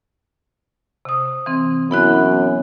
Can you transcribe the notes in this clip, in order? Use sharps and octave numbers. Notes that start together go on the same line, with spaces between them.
C3 D#6
E3 C4
F#2 B3 E4 F#6